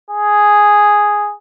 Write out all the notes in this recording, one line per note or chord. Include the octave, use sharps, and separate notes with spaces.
G#4